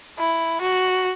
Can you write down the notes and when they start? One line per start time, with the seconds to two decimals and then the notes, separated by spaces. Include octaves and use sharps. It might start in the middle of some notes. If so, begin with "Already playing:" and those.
0.18 E4
0.61 F#4